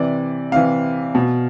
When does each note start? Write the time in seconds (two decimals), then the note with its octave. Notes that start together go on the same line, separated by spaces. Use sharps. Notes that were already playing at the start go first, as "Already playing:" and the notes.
Already playing: C3 E3 D5
0.52 C3 E3 F5
1.15 B2